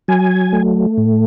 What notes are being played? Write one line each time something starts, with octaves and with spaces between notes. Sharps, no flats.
F#3 G#5
A3
A2